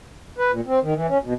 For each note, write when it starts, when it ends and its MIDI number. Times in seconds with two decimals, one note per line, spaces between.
0.38 0.51 71
0.51 0.61 46
0.67 0.79 60
0.83 0.94 51
0.95 1.07 52
1.09 1.18 61
1.24 1.33 47